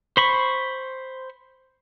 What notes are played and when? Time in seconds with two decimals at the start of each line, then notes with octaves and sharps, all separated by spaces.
0.17 C5 B5 C#6